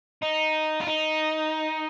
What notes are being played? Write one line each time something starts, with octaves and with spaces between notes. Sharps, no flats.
D#4
F4
D#4